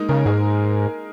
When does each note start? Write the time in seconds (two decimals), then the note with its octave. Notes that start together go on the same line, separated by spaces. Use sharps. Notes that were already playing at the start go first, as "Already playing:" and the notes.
Already playing: G#3 A#3 D#4
0.09 C#3 A#4
0.26 G#2 G#4